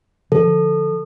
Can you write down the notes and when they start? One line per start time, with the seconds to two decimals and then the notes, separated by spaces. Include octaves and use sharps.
0.32 D3 F3 A4